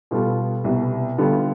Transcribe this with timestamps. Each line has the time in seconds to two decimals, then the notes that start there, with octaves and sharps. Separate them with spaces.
0.11 B2 G3 B3 F4 A4
0.64 C2 B2 B3
1.18 D3 G3 B3 F4